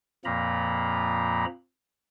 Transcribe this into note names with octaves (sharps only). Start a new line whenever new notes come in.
F2 A#2 F3 A#3 A#5 B5